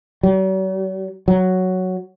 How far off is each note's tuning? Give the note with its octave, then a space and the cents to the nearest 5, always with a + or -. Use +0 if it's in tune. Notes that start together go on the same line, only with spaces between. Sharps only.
F#3 +45
F#3 +0